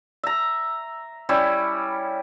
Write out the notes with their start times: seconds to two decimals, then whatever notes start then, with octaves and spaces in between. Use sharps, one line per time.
0.23 E5 A#5
1.29 G3 C#4 E4